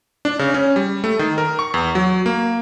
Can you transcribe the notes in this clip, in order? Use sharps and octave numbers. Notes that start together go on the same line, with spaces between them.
D4
C#3
C#4
G3
A3
D#3
A#4
C#6
E2
F#3
A#3